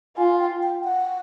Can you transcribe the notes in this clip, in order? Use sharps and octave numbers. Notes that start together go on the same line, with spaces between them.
F4 G#5
G5
G5
F#5